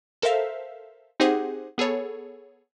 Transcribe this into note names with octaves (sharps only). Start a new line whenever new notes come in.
A4 A#4 C5 E5 F5
C4 D#4 G4 G#4 C5 F#5
B3 G#4 A4 C#5